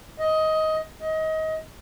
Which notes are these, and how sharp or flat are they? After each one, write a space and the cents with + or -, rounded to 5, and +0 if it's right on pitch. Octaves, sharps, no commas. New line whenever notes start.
D#5 +15
D#5 +25